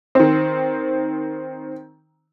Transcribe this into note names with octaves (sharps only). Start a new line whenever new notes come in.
D#3 C4